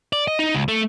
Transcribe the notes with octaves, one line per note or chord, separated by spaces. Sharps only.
D5
D#5
D#4
C#2
A3